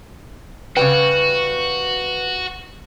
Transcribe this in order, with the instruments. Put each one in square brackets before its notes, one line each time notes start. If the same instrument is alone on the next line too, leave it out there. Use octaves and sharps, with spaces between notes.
[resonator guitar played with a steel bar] C#3 G3 G5 [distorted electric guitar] F#4 [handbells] B4